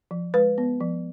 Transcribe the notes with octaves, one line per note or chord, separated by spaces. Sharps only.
F3
G#3 B4
B3
F3